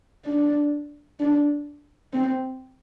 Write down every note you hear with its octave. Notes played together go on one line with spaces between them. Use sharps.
D4
D4
C4